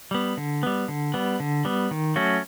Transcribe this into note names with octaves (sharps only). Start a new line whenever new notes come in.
G3 B3
D3
G3 B3
D3
G3 B3
D3
G3 B3
D#3
F#3 A3 C#4 F#4